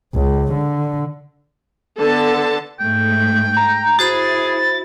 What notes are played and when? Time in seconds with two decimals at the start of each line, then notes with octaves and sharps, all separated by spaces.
0.15 C#2
0.53 D3
1.98 D3 B3 A4 A5
2.80 G#2 A3 G5
3.57 A#5
3.99 E4 F#4 G#4 C5 B5 A6